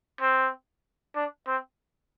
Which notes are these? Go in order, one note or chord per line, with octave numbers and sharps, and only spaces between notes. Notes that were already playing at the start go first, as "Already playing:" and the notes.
C4
D4
C4